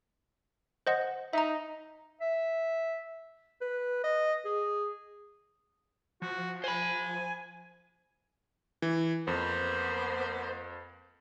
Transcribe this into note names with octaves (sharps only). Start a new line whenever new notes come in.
C5 D#5 F#5
D#4 E5 A#5
E5
B4
D#5
G#4
F3 F#4
C5 G#5 B5
E3
F2 A#3 B3 C5